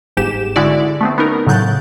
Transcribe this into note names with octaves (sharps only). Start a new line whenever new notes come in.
G1 G#2 G4 E7
D3 G#3 E4 F#4 D5
A3 B3 C4
B3 C#4 D#4 A#4
A2 C#3 F#3 F#6 G6 A6